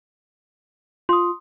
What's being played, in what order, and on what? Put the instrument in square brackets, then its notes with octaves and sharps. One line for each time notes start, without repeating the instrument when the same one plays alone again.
[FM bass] F4 [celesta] C6 D#6